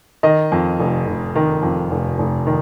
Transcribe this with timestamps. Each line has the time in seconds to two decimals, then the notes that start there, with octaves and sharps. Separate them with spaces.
0.23 D#3 D#5
0.52 F2
0.80 F1
1.07 F1
1.35 D#3
1.63 F2
1.91 F1
2.19 F1
2.47 D#3